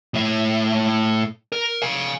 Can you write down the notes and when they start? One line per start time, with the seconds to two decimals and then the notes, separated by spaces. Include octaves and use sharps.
0.14 A2 E5
1.52 A#4
1.82 F5 G#5